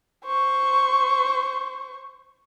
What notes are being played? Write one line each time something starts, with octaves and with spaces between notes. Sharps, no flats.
C5 C#6